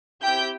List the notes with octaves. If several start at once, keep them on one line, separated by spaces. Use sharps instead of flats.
C4 E4 G4 G5 G6